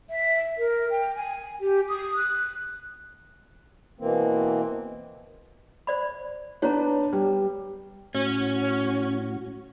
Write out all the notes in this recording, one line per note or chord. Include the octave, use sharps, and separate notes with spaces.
E5
A#4
G5
G#5
G4
D#6
F#6
B2 E3 A#3 C4
C5 D5 B5
B3 D4 B4 C#5 A#5
G3
A2 C#4 F#4